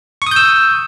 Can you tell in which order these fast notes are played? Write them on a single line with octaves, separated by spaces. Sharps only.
C#6 D#6 G6 E6